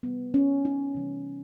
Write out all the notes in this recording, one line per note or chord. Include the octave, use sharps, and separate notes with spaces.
C3 E3 G3 B3
C#4
D#4
C3 E3 G3